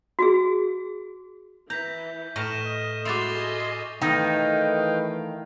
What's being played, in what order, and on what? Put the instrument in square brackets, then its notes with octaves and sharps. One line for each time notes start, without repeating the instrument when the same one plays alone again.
[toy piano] F#4 G#4
[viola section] E3 [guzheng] A#5 [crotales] G6 B6
[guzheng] A2 A5 A#5 [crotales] C#6 F6 E7
[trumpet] D#5
[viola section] G#3 A3 [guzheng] E4 F#4 [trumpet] C6 [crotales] D6 A6 F7
[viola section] A4 D#5 G#5
[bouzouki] D#3 [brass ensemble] E3 A3 [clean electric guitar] D#4 [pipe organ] B4 F5 G5